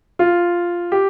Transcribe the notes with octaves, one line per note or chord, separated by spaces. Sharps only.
F4
G4